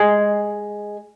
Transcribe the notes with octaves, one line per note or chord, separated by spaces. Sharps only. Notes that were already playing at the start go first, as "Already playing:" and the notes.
Already playing: G#3